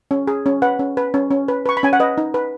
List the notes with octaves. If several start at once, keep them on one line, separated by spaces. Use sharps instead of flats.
C#4
G#4
C#4
B4 F#5
C#4
B4
C#4
C#4
B4
B4 C#6
B5
C#4 G#5
F#5
B4 D#5
D#4
B4